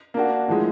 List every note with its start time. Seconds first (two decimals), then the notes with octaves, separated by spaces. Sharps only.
0.14 A#3 D4 F#4
0.48 A2 F3 G#3